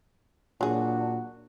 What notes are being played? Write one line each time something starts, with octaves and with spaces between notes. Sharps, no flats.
A#2 F#3 D4 F#4 G#4